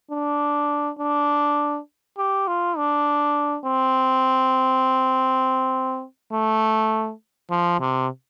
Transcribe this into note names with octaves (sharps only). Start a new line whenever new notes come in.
D4
D4
G4
F4
D4
C4
A3
F3
C3